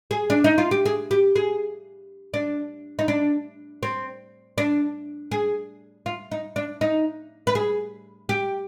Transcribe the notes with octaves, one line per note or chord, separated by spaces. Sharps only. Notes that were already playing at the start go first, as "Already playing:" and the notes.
G#4
D4
D#4
F4
G4
G#4
G4
G#4
D4
D#4
D4
C4
D4
G#4
F4
D#4
D4
D#4
B4
G#4
G4